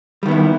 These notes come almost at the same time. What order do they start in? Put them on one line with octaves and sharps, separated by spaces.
G3 D#3 B3 E4